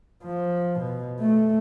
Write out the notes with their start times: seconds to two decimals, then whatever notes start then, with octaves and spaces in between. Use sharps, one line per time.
0.23 F3
0.79 B2
1.20 A3